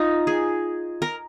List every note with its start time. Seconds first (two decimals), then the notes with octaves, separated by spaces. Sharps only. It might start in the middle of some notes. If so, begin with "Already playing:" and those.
Already playing: D#4 F4
0.27 G#4
1.02 A#4